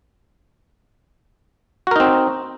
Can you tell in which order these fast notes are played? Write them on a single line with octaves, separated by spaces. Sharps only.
F#4 A#4 D#4 C4